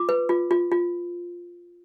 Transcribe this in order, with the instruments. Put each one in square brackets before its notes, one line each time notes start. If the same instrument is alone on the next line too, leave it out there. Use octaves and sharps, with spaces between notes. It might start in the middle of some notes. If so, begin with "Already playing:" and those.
Already playing: [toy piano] F4 D6
B4
F4
F4
F4